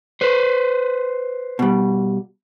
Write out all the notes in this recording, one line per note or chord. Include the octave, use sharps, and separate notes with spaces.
B4 C5
B2 G3